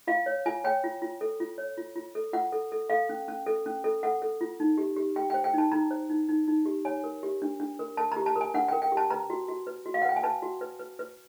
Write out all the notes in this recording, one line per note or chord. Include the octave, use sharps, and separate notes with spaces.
F4 F5
C#5
F4 G#5
C#5 G5
F4
F4
A4
F4
C#5
F4
F4
A4
F4 F#5
A4
A4
A4 F5
C#4
C#4
A4
C#4
A4
A4 F#5
A4
F4
D#4
G4
G4
G4 G5
C5 G5
G5
D#4 A5
D#4 A#5
C5
D#4
D#4
D#4
G4
C#5 G#5
A#4
G4
D4
D4
A#4
A#4 A5
G4 A#5
A5
A#4
G#5
D4 F#5
A#4 G5
G5
G4
A5
B4 A#5
F#4
F#4
B4
F#4
F5
F#5
B4 G5
G#5
B4 A5
F#4
B4
B4
B4